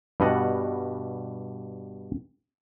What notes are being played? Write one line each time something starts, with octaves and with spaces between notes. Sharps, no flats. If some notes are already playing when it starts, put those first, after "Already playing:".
G2 B2 G3 D#5 F#5